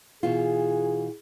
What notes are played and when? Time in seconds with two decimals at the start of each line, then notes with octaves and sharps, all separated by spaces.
0.23 B2 E3 F4 G#4